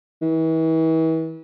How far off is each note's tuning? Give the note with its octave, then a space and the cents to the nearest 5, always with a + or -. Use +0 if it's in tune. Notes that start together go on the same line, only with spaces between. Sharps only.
E3 -35